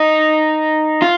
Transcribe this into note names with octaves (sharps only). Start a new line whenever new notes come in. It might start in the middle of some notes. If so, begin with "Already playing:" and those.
Already playing: D#4
F4